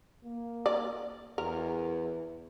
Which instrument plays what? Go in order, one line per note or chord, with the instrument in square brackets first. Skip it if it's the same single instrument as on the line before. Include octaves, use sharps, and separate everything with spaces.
[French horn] A#3
[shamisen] D5
[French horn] E2 [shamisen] A#4